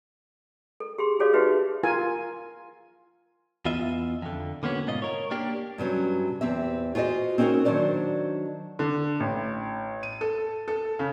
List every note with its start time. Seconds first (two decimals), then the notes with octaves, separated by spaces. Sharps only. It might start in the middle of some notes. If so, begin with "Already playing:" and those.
0.80 A4
0.98 G4 G#4 C6
1.19 F#4 G#4 A4 C#5 D5 F5
1.33 D#4 F#4 G4 B4 E5
1.83 F4 A#4 G#5
3.65 E2 B3 F4 D#5 E5
4.22 F2 D3
4.63 D3 A#3 B3 C#4 F#4
4.87 G#2 B2 F4 D#5
5.02 A#4 C#5
5.31 A#3 D4 G4
5.78 G2 C3 F#3 C#4
6.41 E2 C4 G4 E5
6.95 F4 F#4 G#4 C5 D#5
7.38 C4 C#4 D#4 F4 F#4 A#4
7.65 D#3 F#3 D4 C5 D5
8.79 D3
9.20 A1
10.03 D#7
10.21 A4
10.68 A4
10.99 C#3